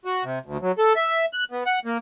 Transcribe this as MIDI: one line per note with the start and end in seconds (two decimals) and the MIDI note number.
0.05 0.24 66
0.24 0.39 48
0.46 0.57 38
0.62 0.72 54
0.78 0.93 69
0.96 1.25 76
1.33 1.44 90
1.51 1.64 59
1.66 1.79 78
1.85 1.98 58